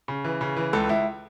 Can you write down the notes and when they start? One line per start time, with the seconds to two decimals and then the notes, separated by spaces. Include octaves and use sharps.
0.08 C#3
0.24 E3
0.41 C#3
0.56 E3
0.73 C#2 A4
0.89 C#2 E4